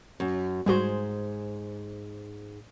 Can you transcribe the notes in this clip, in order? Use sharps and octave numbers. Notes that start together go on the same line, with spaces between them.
F#2
G#2 G3 F#4 G#4 C5